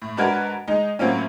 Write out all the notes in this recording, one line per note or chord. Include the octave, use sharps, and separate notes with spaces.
A2
G#2 D4 F#4 A#4 B4 G#6
G#3 D#4
A2 F#3 A#3 C4 C#4